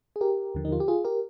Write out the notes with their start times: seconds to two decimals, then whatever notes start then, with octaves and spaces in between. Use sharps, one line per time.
0.16 G#4
0.21 G4 A#4
0.55 D#2 D3 F3
0.65 D#4
0.72 F4
0.80 G4
0.88 F4 G#4
1.05 G4 A#4